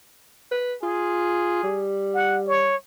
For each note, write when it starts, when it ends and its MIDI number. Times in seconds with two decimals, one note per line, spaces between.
0.51 0.74 71
0.83 1.59 65
0.83 1.87 68
1.63 2.76 55
2.15 2.40 78
2.48 2.76 73